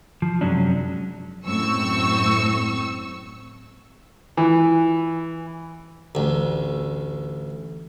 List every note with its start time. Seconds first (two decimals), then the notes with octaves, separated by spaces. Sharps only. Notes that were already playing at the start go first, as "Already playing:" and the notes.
0.22 F3
0.41 F#2 C3 F#3 G#3 C#4 D4
1.46 F#2 A2 C4 C#6 E6
4.37 E3
6.15 A1 D2